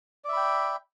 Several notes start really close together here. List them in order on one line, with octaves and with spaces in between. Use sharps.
D5 E5 B5 G5